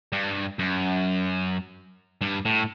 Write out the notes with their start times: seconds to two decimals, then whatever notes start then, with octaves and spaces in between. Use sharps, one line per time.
0.12 G2
0.59 F#2
2.21 G2
2.45 A2